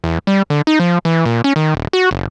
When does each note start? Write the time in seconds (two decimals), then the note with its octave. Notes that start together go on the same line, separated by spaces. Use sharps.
0.04 E2
0.27 G3
0.50 D3
0.67 D#4
0.80 F3
1.05 E3
1.26 A#2
1.44 C#4
1.56 D#3
1.75 D#1
1.93 F#4
2.11 F#1